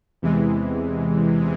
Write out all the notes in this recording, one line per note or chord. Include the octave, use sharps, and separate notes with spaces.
E2 C3 E3 G#3